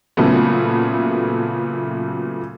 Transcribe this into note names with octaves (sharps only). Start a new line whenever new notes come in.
A#2 C#3 F#3 A3 B3